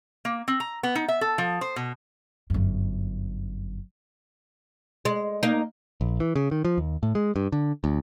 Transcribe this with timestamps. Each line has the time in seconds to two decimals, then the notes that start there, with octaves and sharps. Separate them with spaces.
0.25 A#3
0.48 C4
0.60 A#5
0.83 B3
0.95 D#4
1.08 E5
1.21 A4
1.38 F3
1.61 C5
1.76 B2
2.50 G1 F#2
5.05 G#3
5.43 A#3 D#4
6.01 A#1
6.20 E3
6.36 C#3
6.51 D#3
6.65 F3
6.78 D#2
7.03 A2
7.15 G#3
7.36 G2
7.52 D3
7.84 D2